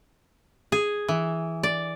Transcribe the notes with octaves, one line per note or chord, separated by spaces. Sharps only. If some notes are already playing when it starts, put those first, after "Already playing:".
G#4
E3
D5